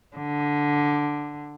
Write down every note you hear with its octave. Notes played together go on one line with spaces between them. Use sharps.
D3